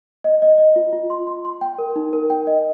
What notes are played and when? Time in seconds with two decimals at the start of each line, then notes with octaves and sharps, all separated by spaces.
0.24 D#5
0.42 D#5
0.58 D#5
0.76 F4
0.93 F4
1.10 C6
1.27 C6
1.45 C6
1.61 G5
1.78 A#4
1.96 D#4
2.13 A#4
2.30 G5
2.47 D#5